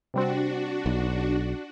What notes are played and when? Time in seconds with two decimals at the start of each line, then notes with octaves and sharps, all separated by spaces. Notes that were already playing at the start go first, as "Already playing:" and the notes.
0.14 C3 G3 C4 D4 F#4
0.86 B1